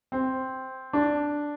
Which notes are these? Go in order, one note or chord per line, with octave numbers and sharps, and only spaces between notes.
C4
D4